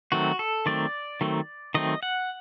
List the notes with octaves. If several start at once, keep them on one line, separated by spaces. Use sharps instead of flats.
D#3 F#3 A3 C4 F#4
A4
D#3 F#3 A3 C4 D5
D#3 F#3 A3 C4
D#3 F#3 A3 C4 D#5
F#5